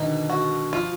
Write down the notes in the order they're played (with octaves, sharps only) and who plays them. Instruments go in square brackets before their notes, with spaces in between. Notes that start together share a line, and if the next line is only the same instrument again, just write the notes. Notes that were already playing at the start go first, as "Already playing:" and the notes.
Already playing: [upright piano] B2 D3 D#3 [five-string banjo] D#4
[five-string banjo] F#4
[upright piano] F3 [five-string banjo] F4